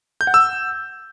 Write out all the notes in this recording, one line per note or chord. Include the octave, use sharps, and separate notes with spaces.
G6
F#5
E6